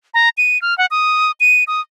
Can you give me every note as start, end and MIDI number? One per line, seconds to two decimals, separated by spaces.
0.14 0.29 82
0.38 0.60 99
0.62 0.77 89
0.78 0.86 78
0.91 1.31 87
1.40 1.64 99
1.67 1.81 87